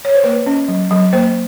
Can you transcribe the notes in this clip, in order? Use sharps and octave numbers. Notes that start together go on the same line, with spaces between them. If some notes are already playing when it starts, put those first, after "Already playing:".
C#5
C5
A#3 B4
C#4
F#3
F#3
A#3 C5